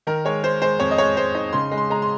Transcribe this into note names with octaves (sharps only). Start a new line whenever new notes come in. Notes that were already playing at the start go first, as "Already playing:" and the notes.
D#3 A#4
G#3 C#5
G#3 C5
G#3 C5
F2 C#5
D#5
G#3 C#5
G#3 C5
D#4
C#3 C6
G#3
C6
G#3 A#5
C6